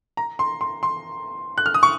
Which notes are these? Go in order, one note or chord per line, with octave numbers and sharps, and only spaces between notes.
A#5
C6
C6
C6
F#6
F6
D#6
C#6